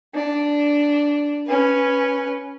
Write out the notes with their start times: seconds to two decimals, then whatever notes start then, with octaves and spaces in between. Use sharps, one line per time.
0.15 D4
1.47 C#4 B4